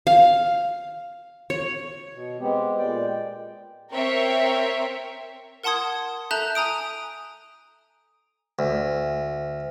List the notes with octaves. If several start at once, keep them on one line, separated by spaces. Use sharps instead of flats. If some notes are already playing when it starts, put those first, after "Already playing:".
F5
C#5
B2
G#3 B3 C4 G4
A#2 G#3 D5 G5
C4 A#4 C#5 E5 G5
A#4 F#5 A5 C6 D#6 G#6
A4 E5 A5 A#5 F#6 G6
G#5 A#5 D#6 D7
D2